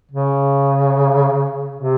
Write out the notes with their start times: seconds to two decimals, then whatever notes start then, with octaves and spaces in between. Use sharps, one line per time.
0.11 C#3
1.76 C3